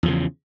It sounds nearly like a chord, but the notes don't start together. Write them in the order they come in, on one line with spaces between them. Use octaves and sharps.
E2 F3 C#3